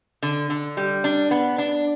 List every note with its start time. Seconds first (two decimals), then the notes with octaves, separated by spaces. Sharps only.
0.23 D3
0.50 D3
0.77 G3
1.04 D4
1.31 B3
1.58 D4